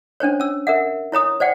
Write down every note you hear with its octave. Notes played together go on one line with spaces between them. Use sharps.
C#4 D4 C5 C#5
C#4 E6
A#4 E5 F#5
E4 C#5 A#5 D#6
C5 D5 F#5 G5